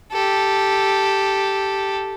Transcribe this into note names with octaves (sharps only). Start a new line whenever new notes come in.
G4 A4